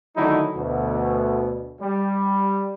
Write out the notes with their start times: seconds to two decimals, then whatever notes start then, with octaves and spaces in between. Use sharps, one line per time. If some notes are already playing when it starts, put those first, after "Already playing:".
0.17 D3 D#3 F#3 A3 D#4 E4
0.56 D2 B2
1.82 G3